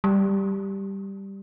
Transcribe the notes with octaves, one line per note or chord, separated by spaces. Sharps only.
G3